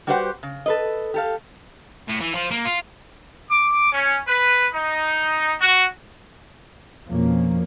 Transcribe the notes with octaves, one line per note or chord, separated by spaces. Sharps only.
G3 F#4 G4 B4 C5 F#5
C#3
A4 B4 D#5
G4 A4 F5
A2
E3
F3
A#3
F4
D6
C#4
B4
D#4
F#4
F2 B2 F3 A#3 C#4